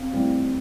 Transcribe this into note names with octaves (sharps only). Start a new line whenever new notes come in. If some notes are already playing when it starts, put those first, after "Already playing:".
Already playing: C4 F5
A2 G3 C4